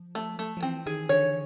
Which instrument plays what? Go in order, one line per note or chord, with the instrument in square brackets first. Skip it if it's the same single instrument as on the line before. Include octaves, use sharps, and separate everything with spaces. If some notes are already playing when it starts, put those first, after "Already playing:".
Already playing: [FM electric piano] F3
[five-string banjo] A3
A3
[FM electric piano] F3
[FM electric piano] E3 [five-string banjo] C4
[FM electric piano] D#3 [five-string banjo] G#4
[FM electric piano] D3 [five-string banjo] C#5